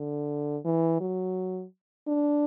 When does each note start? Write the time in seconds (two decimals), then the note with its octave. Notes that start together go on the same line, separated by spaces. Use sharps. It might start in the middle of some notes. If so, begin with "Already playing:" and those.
Already playing: D3
0.65 E3
1.01 F#3
2.08 D4